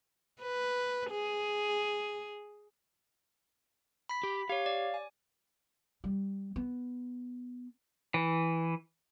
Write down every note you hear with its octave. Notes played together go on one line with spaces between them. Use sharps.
B4
G#4
B5 B6
G4
G4 C#5 F5
D5
G#5
G3
B3
E3